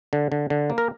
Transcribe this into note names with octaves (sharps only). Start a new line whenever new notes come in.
D3
D3
D3
A#3
A#4